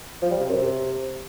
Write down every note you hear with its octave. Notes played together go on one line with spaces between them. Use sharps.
F3
G3
C3
F#2
C3